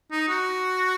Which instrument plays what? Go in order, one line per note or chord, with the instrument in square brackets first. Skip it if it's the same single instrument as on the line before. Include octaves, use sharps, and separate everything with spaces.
[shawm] D#4
F#4